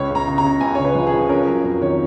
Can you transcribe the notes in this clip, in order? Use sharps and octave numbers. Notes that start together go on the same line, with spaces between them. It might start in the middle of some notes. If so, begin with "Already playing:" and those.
Already playing: C#2 C#5
C#3 A#5
C#3
A#5
C#3
C#2 G#5
C#3 C#5
B4
F3
G#4
F3
C#4 A#4
F#3 A#4
F2 A#4
D#3 C#5